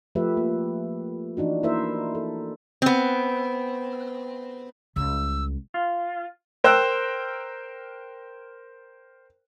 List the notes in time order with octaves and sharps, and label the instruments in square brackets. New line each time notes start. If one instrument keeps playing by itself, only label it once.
[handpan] F3 A3 G4 B4 E5
A#3
E3 D4 D#4 F#4
A#3 E4 A#4 C5 E5
A4
[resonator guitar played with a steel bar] B3 C4
[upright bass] C#2 G3 [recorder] E6
[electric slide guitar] F4
[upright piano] A#4 C5 G5 E6 F#6